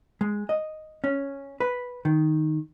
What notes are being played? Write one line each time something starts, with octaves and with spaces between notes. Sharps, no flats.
G#3
D#5
C#4
B4
D#3